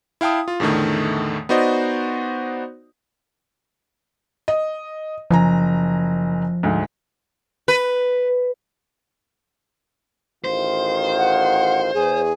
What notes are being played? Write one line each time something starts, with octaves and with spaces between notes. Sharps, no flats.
E4 F5 G5 A5 D#6
F4
E2 A2 D3 D#3 A3
B3 D#4 F#4 C5 D5 D#5
D#5
F#1 F3 G#5 A#5
D2 G#2
B4
A1 D#3 F4 C5
F#5
E2 G#4